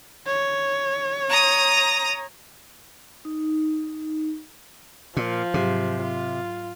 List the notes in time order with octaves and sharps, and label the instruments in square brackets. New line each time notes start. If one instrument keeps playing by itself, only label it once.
[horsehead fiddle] C#5
[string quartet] A#5 D#6
[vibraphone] D#4
[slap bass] A#2 [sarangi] F3
[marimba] G#2 F#3 G4 [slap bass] C3
[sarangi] F4